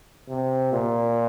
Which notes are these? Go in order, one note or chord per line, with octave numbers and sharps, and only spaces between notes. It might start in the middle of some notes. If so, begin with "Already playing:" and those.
C3
A#2